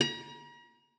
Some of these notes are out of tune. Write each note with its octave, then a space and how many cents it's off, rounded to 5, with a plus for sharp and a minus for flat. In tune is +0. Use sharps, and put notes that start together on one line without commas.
A#5 +40